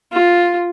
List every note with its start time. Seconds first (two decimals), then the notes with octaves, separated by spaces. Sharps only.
0.12 F4